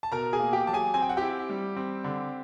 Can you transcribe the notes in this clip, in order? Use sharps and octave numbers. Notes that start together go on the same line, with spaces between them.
A5
B2 A#4 A#5
G#4 G#5
A#3
G4 G5
F#3 A5
G#4 G#5
C4 G#5
G5
F#5
E4 G4 G5
G3
C4
D3